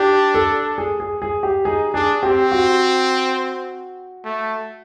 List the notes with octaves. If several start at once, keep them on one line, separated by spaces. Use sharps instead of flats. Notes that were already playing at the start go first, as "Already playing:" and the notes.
Already playing: D4 G4
A4
G#4
G#4
G#4
G4
D#4 G#4
D4 G#4
C4 G4
F#4
A3